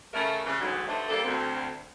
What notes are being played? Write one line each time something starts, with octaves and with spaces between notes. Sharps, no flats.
C#3 A3 A#4
C#3 E3 G3
D2 G#2 E3 F#3
G2 D3 A3 D4 C5 E5
G3 A#3 D4 G4 A4
D2 C4